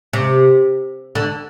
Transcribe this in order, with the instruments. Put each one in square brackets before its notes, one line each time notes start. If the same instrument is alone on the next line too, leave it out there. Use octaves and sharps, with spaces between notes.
[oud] C3
D3